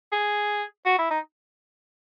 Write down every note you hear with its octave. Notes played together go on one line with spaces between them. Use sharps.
G#4
F#4
E4
D#4